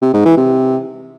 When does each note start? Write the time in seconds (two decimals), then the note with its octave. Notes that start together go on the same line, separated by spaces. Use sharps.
0.02 C3
0.14 G#2
0.25 E3
0.37 C3